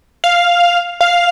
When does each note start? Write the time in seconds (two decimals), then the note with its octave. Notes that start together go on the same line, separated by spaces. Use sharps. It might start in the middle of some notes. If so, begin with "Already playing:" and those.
0.24 F5
1.01 F5